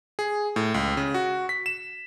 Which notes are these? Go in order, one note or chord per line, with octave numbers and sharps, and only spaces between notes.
G#4
A2
C#2
C#3
F#4
B6
E7